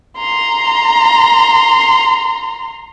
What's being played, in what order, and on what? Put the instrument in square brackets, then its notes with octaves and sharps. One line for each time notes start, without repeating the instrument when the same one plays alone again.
[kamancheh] A#5 C6